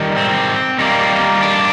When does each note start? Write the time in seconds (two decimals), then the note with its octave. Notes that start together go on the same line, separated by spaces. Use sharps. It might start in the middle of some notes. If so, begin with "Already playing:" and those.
Already playing: D#3 G3
0.16 C4
0.79 D#3 G3 A#3
1.42 D4